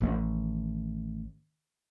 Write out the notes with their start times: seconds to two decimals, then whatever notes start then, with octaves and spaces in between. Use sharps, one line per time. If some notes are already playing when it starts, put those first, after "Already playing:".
0.01 A1 D#3